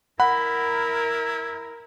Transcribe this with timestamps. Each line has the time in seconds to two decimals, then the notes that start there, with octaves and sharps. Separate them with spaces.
0.20 E4 A#4 F#5 B5